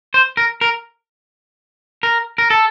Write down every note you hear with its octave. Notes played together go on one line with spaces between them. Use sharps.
C5
A#4
A#4
A#4
A#4
A4